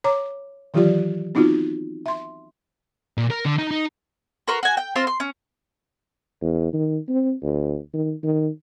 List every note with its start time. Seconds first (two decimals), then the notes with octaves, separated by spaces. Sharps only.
0.04 C#5 A#5 D6
0.74 D#3 E3 F#3 F4 G4 D5
1.35 B3 C4 D#4 F4 F#4
2.06 E5 C6
3.18 A#2
3.30 A#4
3.45 D3
3.58 D#4
3.71 D#4
4.48 F#4 A#4 B4 C6
4.63 F#4 G#5
4.77 G5
4.96 C4 F4 C5 C6
5.07 C6
5.20 C#4
6.42 E2
6.73 D#3
7.09 C4
7.43 D2
7.94 D#3
8.23 D#3